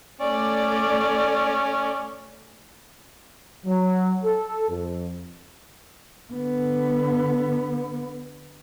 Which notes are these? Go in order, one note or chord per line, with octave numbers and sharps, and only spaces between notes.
A3 C#4 D5
F#3
A4
F2
D3 B3